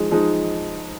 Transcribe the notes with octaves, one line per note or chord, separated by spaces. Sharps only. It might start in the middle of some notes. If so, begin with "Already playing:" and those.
Already playing: F3 G#3 D#4
F3 G#3 D#4